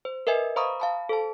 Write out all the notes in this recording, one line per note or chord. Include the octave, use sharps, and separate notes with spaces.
C5
A#4 B4 D#5 E5 G#5
C5 F5 A#5 B5 C#6 D#6
F5 A5 B5
A4 C5 A5